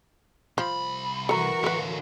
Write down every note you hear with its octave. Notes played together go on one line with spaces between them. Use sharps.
C2 F3 B5
E3 F#4 A4 A#4 A#5 C#6
D3 A4 B4 F5